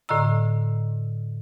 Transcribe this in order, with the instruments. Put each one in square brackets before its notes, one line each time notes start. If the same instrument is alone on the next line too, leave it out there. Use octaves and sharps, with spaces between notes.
[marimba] A2 D3 D#5 A#5 E6